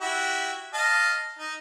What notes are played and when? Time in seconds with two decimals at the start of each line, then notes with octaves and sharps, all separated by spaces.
0.01 E4 F#4 G4
0.74 D#5 F5 A5
1.39 D#4